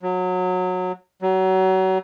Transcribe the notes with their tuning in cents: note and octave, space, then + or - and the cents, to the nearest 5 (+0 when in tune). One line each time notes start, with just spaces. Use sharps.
F#3 -20
F#3 +30